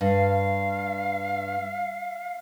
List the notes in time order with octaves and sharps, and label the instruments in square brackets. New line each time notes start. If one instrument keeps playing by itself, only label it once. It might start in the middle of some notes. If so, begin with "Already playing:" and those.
[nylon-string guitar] G2 [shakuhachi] F5